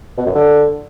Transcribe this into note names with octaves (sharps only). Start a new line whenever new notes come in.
B2
F#2
D3